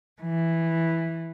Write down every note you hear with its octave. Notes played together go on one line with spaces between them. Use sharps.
E3